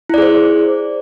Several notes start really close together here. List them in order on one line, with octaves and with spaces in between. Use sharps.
E4 D5 G#4 C5